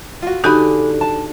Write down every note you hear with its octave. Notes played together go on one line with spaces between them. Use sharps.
F4 F#4
D3 D4 D#4 F#4 G4 G#5 B5
A5